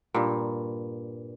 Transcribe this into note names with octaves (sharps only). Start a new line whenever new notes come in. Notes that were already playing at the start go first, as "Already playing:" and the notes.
G2 A#2